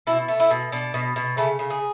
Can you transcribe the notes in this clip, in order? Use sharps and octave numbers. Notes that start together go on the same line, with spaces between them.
B2 E4
A3
E4
B2
B2 D4
B2
B2
C#3 A3
C#3
G#4